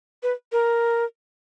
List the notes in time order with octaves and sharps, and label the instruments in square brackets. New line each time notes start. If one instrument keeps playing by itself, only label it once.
[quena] B4
A#4